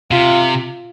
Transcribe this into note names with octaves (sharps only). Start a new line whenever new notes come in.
C3 F4